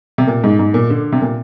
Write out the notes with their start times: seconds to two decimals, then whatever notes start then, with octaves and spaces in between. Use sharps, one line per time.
0.18 C3
0.27 A#2
0.44 G#2
0.59 G#2
0.74 A#2
0.90 D3
1.12 C3
1.21 A#2